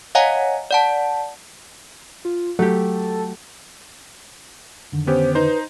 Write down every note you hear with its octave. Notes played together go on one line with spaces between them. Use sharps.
C#5 D#5 F5 F#5 G#5 A#5
D5 F#5 A5
F4
F#3 A3 G4 A4
F2 D3 D#3
B3 C#4 G4 C5
D#4 B4 C5